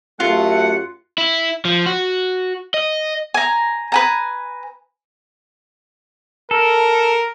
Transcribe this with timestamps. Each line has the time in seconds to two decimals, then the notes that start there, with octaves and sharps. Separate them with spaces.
0.20 F#2 A3 F4 G4 F#5
1.18 E4
1.65 F3
1.86 F#4
2.74 D#5
3.34 G#5 A#5
3.92 B4 G#5 A#5
6.51 A4 A#4